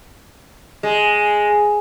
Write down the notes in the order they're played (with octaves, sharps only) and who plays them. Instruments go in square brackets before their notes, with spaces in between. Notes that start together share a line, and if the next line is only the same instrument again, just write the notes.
[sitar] G#3